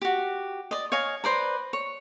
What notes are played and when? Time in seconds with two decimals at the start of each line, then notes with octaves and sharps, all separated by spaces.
0.02 F#4 G4
0.71 D5 D#5
0.92 C#5 D#5 F5 G#5
1.24 B4 C5 D5 A#5
1.73 C#5